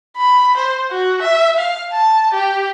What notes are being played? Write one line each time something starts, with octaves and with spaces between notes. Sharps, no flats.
B5
C5
F#4
E5
F5
A5
G4